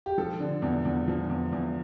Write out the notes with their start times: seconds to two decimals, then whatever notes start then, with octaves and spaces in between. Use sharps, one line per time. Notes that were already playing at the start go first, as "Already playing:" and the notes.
0.06 G4
0.18 F3 A4
0.40 D3
0.62 E2
0.85 E2
1.08 F3
1.30 E2
1.52 E2